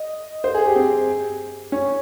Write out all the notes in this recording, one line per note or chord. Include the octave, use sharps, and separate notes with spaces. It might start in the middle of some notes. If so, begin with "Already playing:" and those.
Already playing: D#5
C5
G#4
G4
C4
C#4